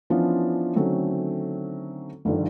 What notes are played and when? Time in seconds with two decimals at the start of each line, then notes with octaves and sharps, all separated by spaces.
0.10 E3 F3 B3 C#4 D4 F4
0.76 D3 D#3 F#3 A3 C4 C#4
2.25 G1 G2 D3 D#3 F3